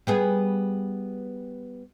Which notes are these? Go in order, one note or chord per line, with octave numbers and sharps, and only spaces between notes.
G3 B3 G#4